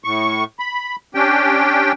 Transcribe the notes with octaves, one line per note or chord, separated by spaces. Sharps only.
A2 C#6
B5
C#4 D4 G4 G5